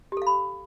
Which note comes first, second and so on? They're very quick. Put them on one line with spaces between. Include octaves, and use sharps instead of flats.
G4 A4 F5 B5